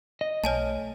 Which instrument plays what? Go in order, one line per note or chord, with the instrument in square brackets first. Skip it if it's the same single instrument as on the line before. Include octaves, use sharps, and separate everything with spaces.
[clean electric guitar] D#5
[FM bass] B1 [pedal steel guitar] A3 F6 [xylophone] C#5 G#5 A5